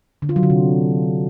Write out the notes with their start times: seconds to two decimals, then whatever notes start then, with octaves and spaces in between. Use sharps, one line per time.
0.22 D3
0.29 F4
0.36 F#3
0.43 D3
0.50 C3